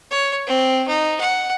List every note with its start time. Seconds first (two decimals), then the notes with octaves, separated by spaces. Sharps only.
0.11 C#5
0.47 C4
0.87 D#4
1.20 F#5